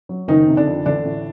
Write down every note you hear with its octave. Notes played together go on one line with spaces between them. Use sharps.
F#3
F#1 D#3 D#4
C3
D3 D4
F2
A1 D3 D4
A2